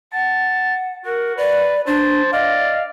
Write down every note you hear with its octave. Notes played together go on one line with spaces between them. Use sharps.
F#5 A5
F#4 A#4
B4 D5
D4 C5 A5
D5 D#5 F5